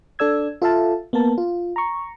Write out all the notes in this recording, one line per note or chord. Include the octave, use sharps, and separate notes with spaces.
D4 A4 D5 E6 G#6
F4 A4 E5 F5 A5
A#3 B3 A#4 A5
F4
A#5 C#6